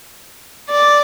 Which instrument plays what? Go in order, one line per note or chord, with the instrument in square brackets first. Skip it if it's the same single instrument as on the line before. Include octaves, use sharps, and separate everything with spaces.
[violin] D5